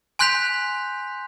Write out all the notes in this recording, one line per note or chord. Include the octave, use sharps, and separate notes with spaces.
G#5 C6 F#6 G6 B6 F7